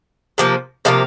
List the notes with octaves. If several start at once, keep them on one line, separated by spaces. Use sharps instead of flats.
C3 F3 A#3
C3 F3 A#3 F5